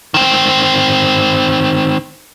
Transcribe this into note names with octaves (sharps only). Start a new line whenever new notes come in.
D#3 C4